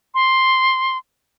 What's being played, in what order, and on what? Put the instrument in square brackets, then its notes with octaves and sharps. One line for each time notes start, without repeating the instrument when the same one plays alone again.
[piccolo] C6